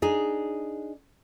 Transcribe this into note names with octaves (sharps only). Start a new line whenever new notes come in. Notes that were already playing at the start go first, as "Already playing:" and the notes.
D4 D#4 G#4